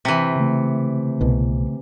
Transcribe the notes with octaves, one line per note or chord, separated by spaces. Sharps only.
C3 E3
C#3 A3
C2 B2